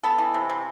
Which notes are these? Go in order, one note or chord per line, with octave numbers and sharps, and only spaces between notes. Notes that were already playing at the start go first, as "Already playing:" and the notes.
B3 A4
E3
C3
C3